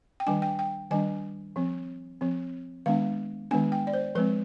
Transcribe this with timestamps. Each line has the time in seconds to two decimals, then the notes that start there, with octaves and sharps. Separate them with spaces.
0.20 G5
0.27 D#3 G3 D4 G#5
0.42 G5
0.59 G5
0.91 D#3 G3 D4 G#5
1.56 F3 C4
2.21 F3 C4
2.86 D#3 G#3 B3 D4 F5
3.51 D#3 G#3 B3 D4 G#5
3.72 G5
3.87 D5
3.93 C5
4.15 F3 G#3 C4 B4